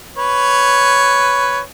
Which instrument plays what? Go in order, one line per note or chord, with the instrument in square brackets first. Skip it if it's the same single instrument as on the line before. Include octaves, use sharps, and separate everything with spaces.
[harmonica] B4 C#5